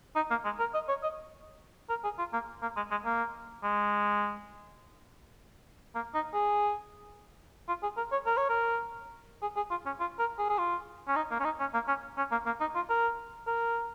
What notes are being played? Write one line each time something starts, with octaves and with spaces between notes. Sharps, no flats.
D#4
A#3
G#3
A#4
D#5
C#5
D#5
A#4
G#4
F4
A#3
A#3
G#3
G#3
A#3
G#3
A#3
D#4
G#4
F4
G#4
A#4
C#5
A#4
C#5
A#4
G#4
G#4
F4
C#4
F4
A#4
G#4
G#4
F4
C#4
D#4
A#3
C#4
D#4
C#4
A#3
C#4
C#4
A#3
A#3
D#4
F4
A#4
A#4